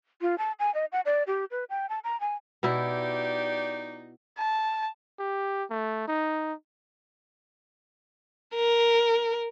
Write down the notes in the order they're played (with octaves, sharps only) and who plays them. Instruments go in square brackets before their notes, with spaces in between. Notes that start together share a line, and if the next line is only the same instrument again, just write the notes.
[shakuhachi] F4
A5
G#5
D#5
F#5
D5
G4
B4
G5
A5
A#5
G#5
[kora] B2 E4 [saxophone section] D#4 G4 D5
[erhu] A5
[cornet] G4
A3
D#4
[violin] A#4